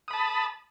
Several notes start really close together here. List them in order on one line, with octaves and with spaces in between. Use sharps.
D#6 B5 A5